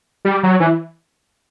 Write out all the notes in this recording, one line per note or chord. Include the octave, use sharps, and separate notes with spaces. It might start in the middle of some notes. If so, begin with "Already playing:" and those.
G3
F#3
E3